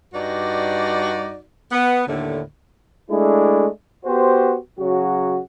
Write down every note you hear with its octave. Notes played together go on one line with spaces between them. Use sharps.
G2 D#4 F#4 D5
B3
D#2 A2 D3
G#3 A3 D4 E4 A4
B3 F#4 G4 C5
C#3 F#3 F#4